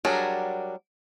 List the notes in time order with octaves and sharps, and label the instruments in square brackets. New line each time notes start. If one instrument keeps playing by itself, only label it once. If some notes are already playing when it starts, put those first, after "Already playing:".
[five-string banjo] F#3 G3 D4 G#4 A#4